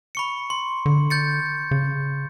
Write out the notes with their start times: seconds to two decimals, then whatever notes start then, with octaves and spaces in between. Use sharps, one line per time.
0.15 B5 C#6 C#7
0.50 C6
0.86 D3
1.10 G6 A6 C#7
1.71 C#3